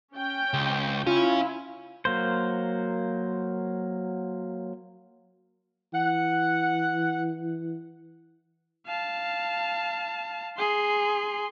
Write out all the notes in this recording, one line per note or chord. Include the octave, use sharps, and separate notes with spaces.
C#4 G5
C#2
C#4 E4 F4
F#3 A#3 C5
E3 F#5
F5 A5
G#4 C6